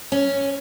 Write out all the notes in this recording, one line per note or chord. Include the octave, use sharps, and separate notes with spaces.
C#4